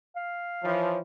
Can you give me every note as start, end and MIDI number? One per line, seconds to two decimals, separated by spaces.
0.16 0.87 77
0.63 1.00 52
0.63 1.00 53
0.63 0.98 73